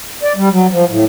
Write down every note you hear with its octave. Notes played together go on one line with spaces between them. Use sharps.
D5
G3
F#3
F3
A2